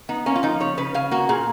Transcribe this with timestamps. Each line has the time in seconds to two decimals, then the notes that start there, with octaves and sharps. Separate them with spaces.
0.09 B3 D#4
0.26 A#3 C#4
0.36 F4
0.43 F3 D#4
0.60 C#3 C#5
0.78 C#3 B4
0.94 C#3 F5
1.11 A#3 F#4
1.29 A#2 G#4